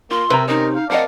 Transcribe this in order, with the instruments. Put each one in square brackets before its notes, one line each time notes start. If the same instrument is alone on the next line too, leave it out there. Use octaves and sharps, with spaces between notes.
[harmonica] A#3 [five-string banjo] F4 [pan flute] C6
[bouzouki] C3 [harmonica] A#4 E5 [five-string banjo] B4 G5 A#5
[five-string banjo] C#4 [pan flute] D#4 [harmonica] A#4 D#5
[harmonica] F5
[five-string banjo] C4 A#4 D#5 [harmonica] D5 F5 A5 [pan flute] F#5